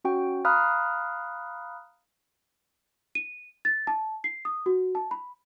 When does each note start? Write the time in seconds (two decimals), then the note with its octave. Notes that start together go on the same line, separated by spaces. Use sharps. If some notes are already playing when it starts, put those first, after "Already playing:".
0.05 C#4 F#4 G5
0.45 F5 A#5 B5 D#6 F6 F#6
3.15 D#7
3.65 A6
3.87 A5
4.24 C7
4.45 D#6
4.66 F#4
4.95 A5
5.11 B5